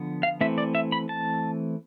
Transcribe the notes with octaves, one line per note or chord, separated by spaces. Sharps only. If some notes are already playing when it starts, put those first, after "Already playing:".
Already playing: D3 F3 B3
F5
E3 A3 C4 E5
D5
E5
B5
A5